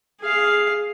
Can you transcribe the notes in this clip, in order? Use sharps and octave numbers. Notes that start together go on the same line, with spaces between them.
G#4 F5